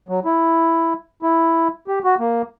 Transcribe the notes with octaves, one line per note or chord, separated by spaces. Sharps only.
F#3
E4
E4
G4
F#4
A#3